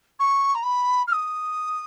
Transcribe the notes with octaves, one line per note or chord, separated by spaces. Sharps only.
C#6
A#5
B5
F6
D#6